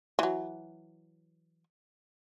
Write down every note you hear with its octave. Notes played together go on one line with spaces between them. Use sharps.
E3 F#3